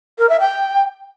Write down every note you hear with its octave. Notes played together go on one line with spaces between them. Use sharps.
A#4
E5
G5